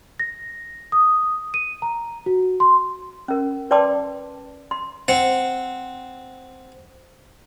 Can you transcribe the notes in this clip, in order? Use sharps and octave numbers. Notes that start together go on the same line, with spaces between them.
A#6
D#6
D#7
A#5
F#4
C6
C#4 A#4
B4 D5 G5 A5 C6 D6
C6
C4 F#5